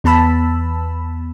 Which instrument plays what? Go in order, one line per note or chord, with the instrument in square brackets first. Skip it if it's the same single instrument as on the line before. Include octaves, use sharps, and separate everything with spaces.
[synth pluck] E2 B3 A5 B5 E6